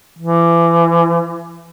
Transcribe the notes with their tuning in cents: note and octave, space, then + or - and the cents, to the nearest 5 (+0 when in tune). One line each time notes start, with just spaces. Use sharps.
E3 +35